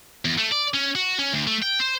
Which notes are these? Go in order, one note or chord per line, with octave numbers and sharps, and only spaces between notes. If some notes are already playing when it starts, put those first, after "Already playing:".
E2
A3
D5
C#4
F#4
C#4
D2
A3
G5
C5